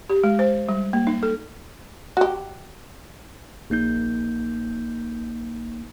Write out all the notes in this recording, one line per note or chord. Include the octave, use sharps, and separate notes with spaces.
G4
G#3
C5
G3
A#3
D#4
A4
F#4 G4
A#1 A#3 D#4 G6